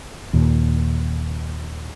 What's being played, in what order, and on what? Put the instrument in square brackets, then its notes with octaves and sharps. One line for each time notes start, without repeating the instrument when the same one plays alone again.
[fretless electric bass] D#2 A#2